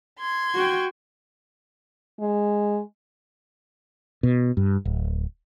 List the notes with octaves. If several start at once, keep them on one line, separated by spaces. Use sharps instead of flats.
C6 G#6
F#4 G5
G#3
B2
G2
D1